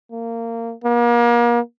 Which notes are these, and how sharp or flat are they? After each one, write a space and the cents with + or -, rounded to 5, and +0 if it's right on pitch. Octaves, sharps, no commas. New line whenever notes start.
A#3 -20
A#3 +35